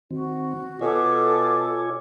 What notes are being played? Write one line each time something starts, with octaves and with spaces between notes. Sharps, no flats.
D#3 C4 F#4
B2 F4 A4 C#5 G#5 D6